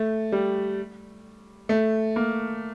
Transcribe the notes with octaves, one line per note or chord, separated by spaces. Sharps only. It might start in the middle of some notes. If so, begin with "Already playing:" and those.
Already playing: A3
G3
A3
A#3